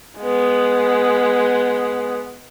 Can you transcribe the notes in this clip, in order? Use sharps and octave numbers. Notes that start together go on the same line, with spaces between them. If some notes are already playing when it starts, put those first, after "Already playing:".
G#3 B3